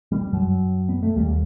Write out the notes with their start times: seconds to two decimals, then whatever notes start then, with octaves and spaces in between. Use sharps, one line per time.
0.12 G3
0.33 F#2 F#3
0.89 B3
1.03 A3
1.16 D#2 G3